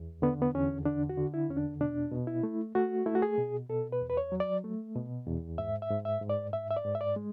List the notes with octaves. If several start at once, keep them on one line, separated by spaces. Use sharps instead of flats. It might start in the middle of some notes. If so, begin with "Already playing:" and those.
Already playing: E2
D3 B3
B3
E2 C#4
D3 D4
F#4
D3
E4
E2 C#4
D4
B2 D4
B2
E4
A3
A3 F#4
A3 E4
F#4
G#4
B2
B2 A4
B4
E2
B4
C#5
F#3
D5
A3
B2
E2
G#2 E5
E5
G#2
E5
G#2
D5
G#2 E5
E5
D5
G#2
E5
D5
G#3